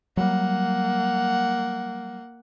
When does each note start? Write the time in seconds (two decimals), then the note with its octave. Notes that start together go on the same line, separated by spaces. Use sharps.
0.17 F#3 G3 A#3 F#5